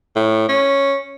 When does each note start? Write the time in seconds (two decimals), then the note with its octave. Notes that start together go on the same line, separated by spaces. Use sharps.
0.16 A2
0.49 C#4